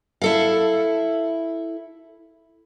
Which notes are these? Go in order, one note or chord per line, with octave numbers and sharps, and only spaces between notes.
E4 A4 F5